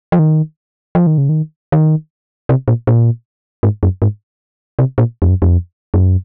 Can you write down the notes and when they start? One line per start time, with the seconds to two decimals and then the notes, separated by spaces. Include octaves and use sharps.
0.12 F3
0.19 D#3
0.95 F3
1.07 D#3
1.18 C#3
1.29 D#3
1.72 D#3
2.49 C3
2.68 A#2
2.87 A#2
3.63 G#2
3.83 F#2
4.02 G#2
4.79 C3
4.98 A#2
5.22 F2
5.29 F#2
5.42 F2
5.94 F#2